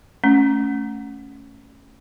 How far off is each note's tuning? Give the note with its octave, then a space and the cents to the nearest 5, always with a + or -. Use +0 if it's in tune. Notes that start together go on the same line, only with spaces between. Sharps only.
A3 +0 C#4 +0